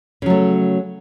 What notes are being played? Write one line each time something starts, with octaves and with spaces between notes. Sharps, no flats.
C#3 F#3 A3